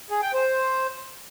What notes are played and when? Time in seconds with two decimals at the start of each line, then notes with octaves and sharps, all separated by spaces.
0.10 G#4
0.22 G5
0.34 C5